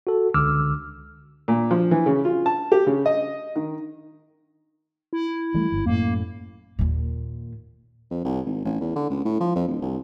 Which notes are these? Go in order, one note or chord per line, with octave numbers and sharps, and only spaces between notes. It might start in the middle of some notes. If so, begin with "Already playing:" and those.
F#4 A4
C#2 D3 D6 E6 F6
A#2
F3
E3
C#3
F4
A5
G4
C#3
D#5
D#3
E4
E3 G3 A3
G1
F#2 A2 A#3
D#2 A#2
F2
C2
G#1
A1
E2
D3
C#2
A2
F3
F2
D1
C2